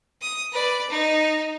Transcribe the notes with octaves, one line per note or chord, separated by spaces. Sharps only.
D#6
B4 D5
D#4